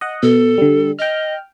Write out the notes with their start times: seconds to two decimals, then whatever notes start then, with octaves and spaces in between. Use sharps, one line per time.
0.01 D#5 F#5
0.23 B2 A4
0.58 D3 G3
0.99 D#5 G5 F6